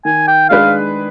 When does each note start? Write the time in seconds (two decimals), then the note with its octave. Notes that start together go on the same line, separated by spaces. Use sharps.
0.05 D#3 G#5
0.28 G5
0.49 G#3 D4 G#4 B4 F5